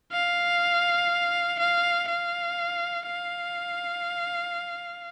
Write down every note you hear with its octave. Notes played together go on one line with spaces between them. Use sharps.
F5
F5
F5
F5